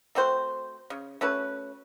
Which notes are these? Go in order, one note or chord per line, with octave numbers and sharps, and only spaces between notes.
A3 C4 F#4 C5
C#3
A3 C#4 F#4 B4